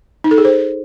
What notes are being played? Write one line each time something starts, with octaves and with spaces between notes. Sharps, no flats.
D#4
A4
G#4
C5